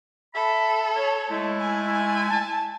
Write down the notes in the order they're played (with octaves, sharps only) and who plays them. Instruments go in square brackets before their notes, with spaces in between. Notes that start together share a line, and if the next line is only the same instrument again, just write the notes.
[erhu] A4 [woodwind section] E5 B5
[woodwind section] C#5
G#3 A3 E4
[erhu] G#5
G#5
[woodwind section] A5